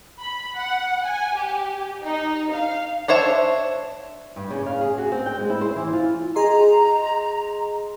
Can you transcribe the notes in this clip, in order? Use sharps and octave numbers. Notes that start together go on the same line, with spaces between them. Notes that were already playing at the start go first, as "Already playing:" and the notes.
B5
F#5
G#5
G4
D#4
F5
D4 C5 C#5 E5 A5
G2
C#3
F5
G#4
F#4
C4
G5
G#3
E4
C5
E3
F4
G#4 D#5 A#5 C6